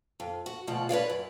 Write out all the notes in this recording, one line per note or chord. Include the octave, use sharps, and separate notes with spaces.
F2
F#4
D2 B2 F3 F#4
B4 C#5 D5 F5
F#2